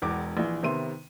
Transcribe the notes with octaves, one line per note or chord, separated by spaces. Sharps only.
E1 E2 D6
A#1 E3
C3 D#3 B3 E5 C6 D#7